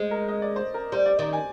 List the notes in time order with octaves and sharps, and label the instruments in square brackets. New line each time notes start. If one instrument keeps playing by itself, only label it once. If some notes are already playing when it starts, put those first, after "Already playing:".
Already playing: [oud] G#3 [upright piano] C5
[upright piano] A#4
D#5
D5
C5
A#4
[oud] G3 [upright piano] C5
[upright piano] D5
[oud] D#3 [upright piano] D5
[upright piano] G#5